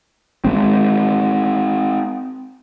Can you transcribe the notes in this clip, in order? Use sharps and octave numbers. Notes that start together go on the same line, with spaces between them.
G#3 C4